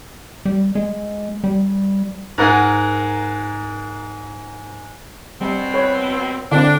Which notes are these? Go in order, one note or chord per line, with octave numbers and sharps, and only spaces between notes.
G3
G#3
G3
G#2 A#4 F#5 G#5
B2 G3 C4
B4 C#5
D3 C4 D4